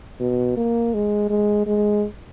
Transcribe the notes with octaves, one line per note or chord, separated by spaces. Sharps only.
B2
A#3
G#3
G#3
G#3